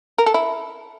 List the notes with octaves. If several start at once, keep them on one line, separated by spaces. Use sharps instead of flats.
A#4
A4
E4